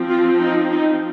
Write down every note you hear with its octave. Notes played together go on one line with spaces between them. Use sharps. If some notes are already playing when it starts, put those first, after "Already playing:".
Already playing: F3 C4
F4
D#4
D#4